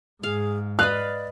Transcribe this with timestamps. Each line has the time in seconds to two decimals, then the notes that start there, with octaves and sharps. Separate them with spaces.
0.23 G#2 G#4 F5
0.79 B4 D5 D#5 F5 F#6